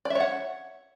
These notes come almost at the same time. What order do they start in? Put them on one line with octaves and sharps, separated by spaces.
D5 E5 C#5 F#5